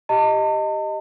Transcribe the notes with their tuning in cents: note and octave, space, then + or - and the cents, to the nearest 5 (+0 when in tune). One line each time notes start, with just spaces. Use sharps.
G4 +0 D#5 +0 A5 +40